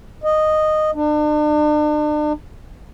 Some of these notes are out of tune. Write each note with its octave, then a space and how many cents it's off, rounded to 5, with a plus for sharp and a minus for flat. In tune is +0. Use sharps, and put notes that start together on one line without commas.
D#5 -10
D4 +40